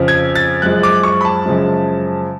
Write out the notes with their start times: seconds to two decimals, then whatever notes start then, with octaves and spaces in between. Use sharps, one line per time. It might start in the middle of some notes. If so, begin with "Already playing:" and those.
Already playing: F2 C#3 F3
0.08 G#6
0.35 A6
0.62 F#2 F3 G#3 F#6
0.83 D6
1.03 C#6
1.21 B5
1.25 A5
1.45 F#2 C#3 F3 G#3